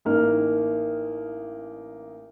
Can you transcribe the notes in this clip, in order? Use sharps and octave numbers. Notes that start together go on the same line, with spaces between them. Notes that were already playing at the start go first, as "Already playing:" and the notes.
A1 A#3 D#4 F6